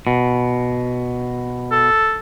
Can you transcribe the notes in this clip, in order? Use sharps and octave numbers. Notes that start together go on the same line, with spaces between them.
B2
A4